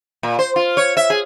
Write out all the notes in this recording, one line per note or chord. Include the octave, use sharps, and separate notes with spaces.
A#2
C5
F4
C#5
E5
G#4